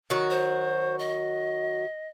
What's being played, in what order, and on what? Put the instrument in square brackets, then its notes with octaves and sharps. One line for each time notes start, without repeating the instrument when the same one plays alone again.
[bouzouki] D#3 F#3 F#4
[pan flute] C5
D#5